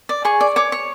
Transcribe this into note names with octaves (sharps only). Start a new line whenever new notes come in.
D5
G#4 C#6
D5
C#5 D6
C#5